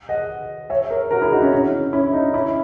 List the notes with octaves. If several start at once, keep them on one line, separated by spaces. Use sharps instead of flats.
D#5 F#5
C#5 E5
A#4 C#5
F#4 A#4
E4 G#4
D#4 F#4
C#4 E4
C#4
C#4 E4
D#4
C#4 E4